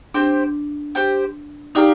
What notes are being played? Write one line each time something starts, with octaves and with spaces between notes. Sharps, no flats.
C4 D4 G4 C5 G5
G4 C5 G5
D4 D#4 G4 A#4 F5